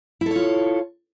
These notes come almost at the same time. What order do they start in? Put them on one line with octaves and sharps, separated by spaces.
E4 A4 C#5 F4